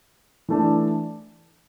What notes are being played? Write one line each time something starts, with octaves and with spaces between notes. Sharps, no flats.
E3 A3 D4